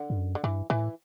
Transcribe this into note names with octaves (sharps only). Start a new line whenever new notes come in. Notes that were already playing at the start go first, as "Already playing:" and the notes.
Already playing: D3
G2
F#2
D3
G2 E3
A2 E3